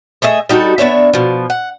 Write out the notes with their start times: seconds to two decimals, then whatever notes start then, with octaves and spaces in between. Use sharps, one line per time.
0.22 A3 G#4 D#5 E5
0.49 G3 D#4 F#4 A4
0.78 B3 D4 C#5 E5
1.13 B2 F3
1.50 F#5